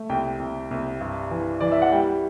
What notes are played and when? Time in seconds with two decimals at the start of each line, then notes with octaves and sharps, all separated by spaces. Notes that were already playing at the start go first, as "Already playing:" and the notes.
Already playing: A3
0.09 C2 G5
0.40 C2
0.71 C2
1.01 G2
1.31 E3
1.61 E3 D5
1.71 E5
1.82 F#5
1.92 G3 G5